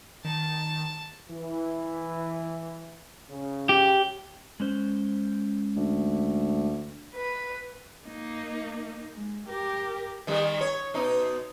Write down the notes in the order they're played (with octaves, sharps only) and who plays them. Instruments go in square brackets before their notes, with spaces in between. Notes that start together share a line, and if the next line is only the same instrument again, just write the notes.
[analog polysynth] D#3 [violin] A5
[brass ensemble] E3
C#3
[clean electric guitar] G4
[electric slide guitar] G#3 C#4 C5
[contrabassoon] D2
[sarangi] B4
[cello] A#3 D#4
G#3
G4 A#4
[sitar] D#3 G3
C#5
B2 D#4